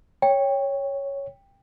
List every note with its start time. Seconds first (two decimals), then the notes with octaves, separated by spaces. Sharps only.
0.22 C#5 G5